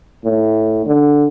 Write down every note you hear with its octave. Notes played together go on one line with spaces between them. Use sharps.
A2
D3